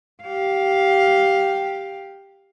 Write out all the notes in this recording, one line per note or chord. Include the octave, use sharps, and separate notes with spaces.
G4 F5